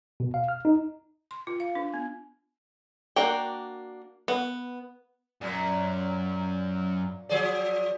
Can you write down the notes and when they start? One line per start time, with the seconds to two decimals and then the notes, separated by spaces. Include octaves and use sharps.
0.20 B2
0.34 F5
0.48 F6
0.65 D#4
1.31 C6
1.47 F4
1.60 F5
1.75 D4
1.94 B3
3.16 A#3 D4 F#4 A#4 G5
4.28 B3
5.41 F#2 A#2
7.29 F3 G#4 D5